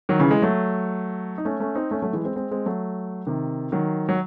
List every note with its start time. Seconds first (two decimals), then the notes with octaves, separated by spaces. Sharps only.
0.09 D#3 F#3
0.19 C#3 E3
0.31 E3 G#3
0.42 F#3 A3
1.38 D#4
1.45 A3 C#4
1.60 A3 C#4
1.75 C4 D#4
1.91 A3 C#4
2.02 F#3 A3
2.13 E3 G#3
2.24 G#3 C4
2.36 G#3 C4
2.51 G#3 C4
2.66 F#3 A3
3.27 C3 D#3
3.72 D#3 F#3
4.09 F#3